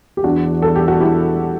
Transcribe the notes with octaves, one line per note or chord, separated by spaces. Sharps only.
G4
E2 D4 F#4
A4
G4
F#4
E4 G4